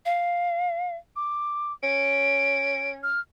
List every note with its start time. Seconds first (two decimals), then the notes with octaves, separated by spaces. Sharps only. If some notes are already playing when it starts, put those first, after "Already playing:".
0.06 F5
1.16 D6
1.83 C#4 D7
3.03 F6